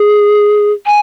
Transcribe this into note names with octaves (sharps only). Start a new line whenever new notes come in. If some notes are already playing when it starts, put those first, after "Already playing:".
Already playing: G#4
G#5